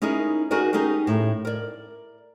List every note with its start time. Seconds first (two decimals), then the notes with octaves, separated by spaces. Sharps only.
0.02 C#4 D#4 E4 G#4 A#4
0.51 D#4 F#4 G#4 A#4 D5
0.73 C#4 D#4 G4 G#4 A#4
1.07 A2
1.45 A#4 D5